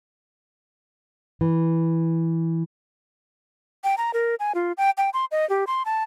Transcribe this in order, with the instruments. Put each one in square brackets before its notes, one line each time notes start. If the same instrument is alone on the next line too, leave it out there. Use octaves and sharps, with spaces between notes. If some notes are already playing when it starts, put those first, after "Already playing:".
[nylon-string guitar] E3
[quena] G5
A#5
A#4
G#5
F4
G5
G5
C6
D#5
G4
C6
A5